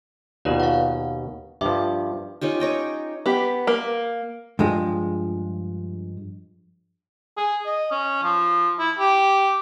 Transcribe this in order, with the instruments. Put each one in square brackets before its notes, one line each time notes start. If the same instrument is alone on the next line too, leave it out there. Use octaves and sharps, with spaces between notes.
[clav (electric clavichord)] D#2 B2 [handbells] F4 B4 D5
[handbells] F5 F#5
[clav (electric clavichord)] G2 F3 [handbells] E5 D6
[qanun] C#4 D#4 F4 G4
C#5 D#5 G5
[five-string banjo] B3 G4
A#3
[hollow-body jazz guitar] G2 F3 G#3
[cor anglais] G#4
D#5
C#4
F3
E4
G4